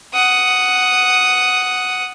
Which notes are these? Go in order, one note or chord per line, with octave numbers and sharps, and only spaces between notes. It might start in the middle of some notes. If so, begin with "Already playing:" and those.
F#5 D#6